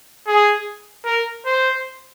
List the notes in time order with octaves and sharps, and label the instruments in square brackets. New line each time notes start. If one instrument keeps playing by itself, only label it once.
[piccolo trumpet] G#4
A#4
C5